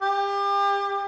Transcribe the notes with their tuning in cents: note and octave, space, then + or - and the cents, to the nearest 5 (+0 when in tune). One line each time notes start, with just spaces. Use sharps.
G4 +30